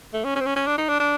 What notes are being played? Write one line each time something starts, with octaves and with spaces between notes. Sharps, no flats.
A3
C#4
C#4
C4
C#4
C#4
D4
D#4
D4
D4